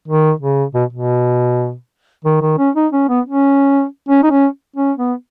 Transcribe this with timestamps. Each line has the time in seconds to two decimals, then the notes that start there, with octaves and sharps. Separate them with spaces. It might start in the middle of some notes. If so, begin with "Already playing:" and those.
0.08 D#3
0.41 C#3
0.75 B2
0.93 B2
2.25 D#3
2.42 D#3
2.58 C#4
2.75 D#4
2.92 C#4
3.09 B3
3.26 C#4
4.09 C#4
4.23 D#4
4.31 C#4
4.76 C#4
4.98 B3